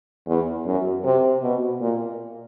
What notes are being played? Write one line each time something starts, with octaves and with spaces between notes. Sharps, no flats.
E2
F#2
C3
B2
A#2